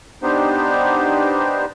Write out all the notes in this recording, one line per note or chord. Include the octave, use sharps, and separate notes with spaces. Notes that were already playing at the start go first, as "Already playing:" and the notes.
B3 D4 D#4 G4 C5